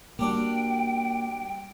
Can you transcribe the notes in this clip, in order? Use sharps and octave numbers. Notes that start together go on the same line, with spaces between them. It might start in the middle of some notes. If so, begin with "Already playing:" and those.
G3 A#3 D4 F#4 G5